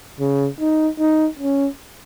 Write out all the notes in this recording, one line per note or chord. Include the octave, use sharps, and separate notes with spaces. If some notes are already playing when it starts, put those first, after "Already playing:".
C#3
D#4
D#4
C#4